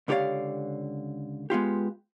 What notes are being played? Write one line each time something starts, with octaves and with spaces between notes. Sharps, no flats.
C#2 D3 G4 C#5 D5 F5
G#3 B3 F4 G4